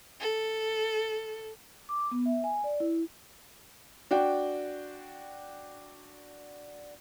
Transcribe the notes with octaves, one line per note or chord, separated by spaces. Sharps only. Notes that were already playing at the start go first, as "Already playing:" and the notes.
A4
D6
B3
E5
G#5
D5
E4
D4 F#4 G5